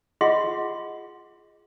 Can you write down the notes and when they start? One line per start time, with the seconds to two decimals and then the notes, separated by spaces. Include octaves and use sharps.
0.21 F4 G#4 D#5 F#5 C6